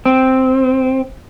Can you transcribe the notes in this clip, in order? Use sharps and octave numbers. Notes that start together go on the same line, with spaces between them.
C4